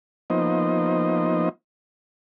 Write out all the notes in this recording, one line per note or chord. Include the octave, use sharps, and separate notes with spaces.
F3 A#3 B3 D#4 C5 D#5